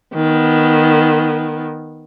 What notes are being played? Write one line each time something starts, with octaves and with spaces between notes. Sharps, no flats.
D#3 B3